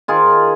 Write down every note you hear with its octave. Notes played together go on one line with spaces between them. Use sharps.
D#3 F4 G#4